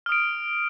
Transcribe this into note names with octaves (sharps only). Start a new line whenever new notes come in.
D#6 F6 D7